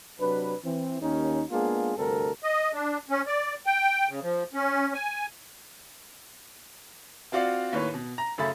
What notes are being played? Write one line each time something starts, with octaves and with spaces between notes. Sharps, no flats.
C3 F#3 D4 B4
E3 C4
D#2 C#4 D#4
G#3 A#3 B3 D4 F4 G#4
D2 G2 C3 C4 A4 A#4
D#5
D4
C#4
D5
G5
C#3
F3
C#4
G#5
C4 F4 F#4 D5 F5
D#2 A2 B4 C#5
B2
A#5
F#2 C#3 A3 E5 B5 A6